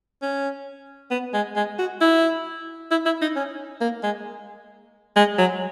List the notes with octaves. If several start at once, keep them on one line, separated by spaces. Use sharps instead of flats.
C#4
B3
G#3
G#3
F#4
E4
E4
E4
D#4
C#4
A#3
G#3
G#3
F#3